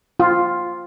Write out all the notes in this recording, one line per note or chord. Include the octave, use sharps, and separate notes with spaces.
F4